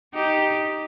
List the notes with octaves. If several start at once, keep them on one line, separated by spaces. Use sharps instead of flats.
D#4 G4